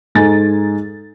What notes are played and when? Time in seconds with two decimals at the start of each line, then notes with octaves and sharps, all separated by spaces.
0.15 G#2 D#4 A4 G#5 A6